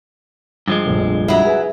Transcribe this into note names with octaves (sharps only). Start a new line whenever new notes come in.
G2 F3 G#3
F1 A#1
F#3 E4
G#4 B4 G#5